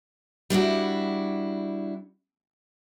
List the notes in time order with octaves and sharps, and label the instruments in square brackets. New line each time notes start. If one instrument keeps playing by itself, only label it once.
[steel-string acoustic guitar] G3 D4 E4 F#4